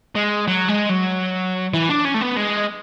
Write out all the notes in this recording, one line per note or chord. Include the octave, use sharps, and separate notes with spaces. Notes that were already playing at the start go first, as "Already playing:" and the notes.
G#3
F#3
G#3
F#3
E3
D4
C#4
A3
B3
G#3